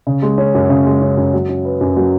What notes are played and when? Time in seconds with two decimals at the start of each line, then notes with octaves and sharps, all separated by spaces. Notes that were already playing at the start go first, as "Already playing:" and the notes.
0.07 C#3
0.22 G#3
0.38 C#4
0.55 F#2
0.70 C#3
0.86 G#3
1.02 C#4
1.17 F#2
1.34 F#3
1.49 C#4
1.65 B4
1.81 F#2
1.96 F#3